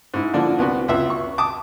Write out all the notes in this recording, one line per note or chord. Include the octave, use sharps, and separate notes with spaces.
G#2 E4
D3 F3 A#3 D4
C2 B3 F#4
C#2 E5
C#6
A5 D6 D#6